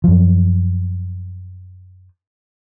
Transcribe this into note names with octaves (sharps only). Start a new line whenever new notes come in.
F#2 F3